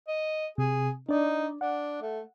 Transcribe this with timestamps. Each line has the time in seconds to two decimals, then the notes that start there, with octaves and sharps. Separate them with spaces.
0.08 D#5
0.58 C3 G#4
1.09 D4 D#4 D5
1.61 D4 F#5
2.02 A3